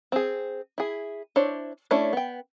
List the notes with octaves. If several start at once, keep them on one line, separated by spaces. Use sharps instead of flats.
C4 G#4
E4 G#4
D4 E4 C5 C#5
A3 C#4 D4 E4 C#5
B3 G5